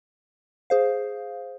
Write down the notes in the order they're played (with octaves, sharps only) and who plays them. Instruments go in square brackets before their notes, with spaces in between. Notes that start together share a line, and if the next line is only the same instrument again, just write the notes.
[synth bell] G#4 C5 F5